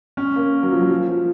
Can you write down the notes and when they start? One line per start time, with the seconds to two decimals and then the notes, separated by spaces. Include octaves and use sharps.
0.17 C#4
0.36 A#3
0.63 F#3
0.72 F3
0.81 F#3
0.90 F3
1.09 F3